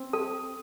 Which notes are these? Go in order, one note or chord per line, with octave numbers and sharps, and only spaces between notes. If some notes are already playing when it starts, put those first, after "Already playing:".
Already playing: C4
A4